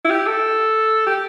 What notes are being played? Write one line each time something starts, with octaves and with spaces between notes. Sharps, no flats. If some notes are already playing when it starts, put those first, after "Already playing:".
E4
G4
A4
G4